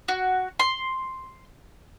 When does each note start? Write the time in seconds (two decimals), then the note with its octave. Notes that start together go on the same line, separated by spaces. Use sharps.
0.08 F#4
0.60 C6